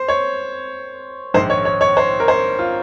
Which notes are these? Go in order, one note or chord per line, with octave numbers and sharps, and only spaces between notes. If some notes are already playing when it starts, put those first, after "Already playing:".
Already playing: C5
C#5
A#1 G#2 D#3 C5
C#5
C#5
C#5
C5
A#4
C5
F4